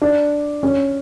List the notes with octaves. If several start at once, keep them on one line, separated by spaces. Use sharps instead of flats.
D4
C#4